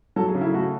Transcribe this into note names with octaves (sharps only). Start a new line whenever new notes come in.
F#3 A4
G#4
C#3
E4
A3 F#4